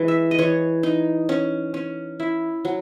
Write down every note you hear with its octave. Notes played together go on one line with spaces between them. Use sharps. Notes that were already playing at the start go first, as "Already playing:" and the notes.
Already playing: E3 G#3
E5
D#5
E3 C#5
D#4
C#4
C#4
E4
F#3